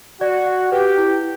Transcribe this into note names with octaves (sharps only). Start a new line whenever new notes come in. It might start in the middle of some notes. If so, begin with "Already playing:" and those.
F#4 D5
F#5
G4 B4
E4